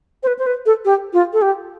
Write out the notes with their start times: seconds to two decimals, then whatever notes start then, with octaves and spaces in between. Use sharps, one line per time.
0.23 C5
0.27 B4
0.39 C5
0.47 B4
0.66 A4
0.85 G4
1.13 F4
1.33 A4
1.42 G4